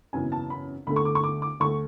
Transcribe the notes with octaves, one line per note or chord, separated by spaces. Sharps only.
G#1 F#2 C#3 E3 B3 G#5
A5
B5
D2 D3 A3 B5
C#6
D6
C#6
D6
D6
D2 D3 A3 C#6